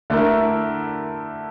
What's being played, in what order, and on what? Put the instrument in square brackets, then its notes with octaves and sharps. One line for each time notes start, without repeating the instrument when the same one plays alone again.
[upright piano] D3 A3 E4 A#4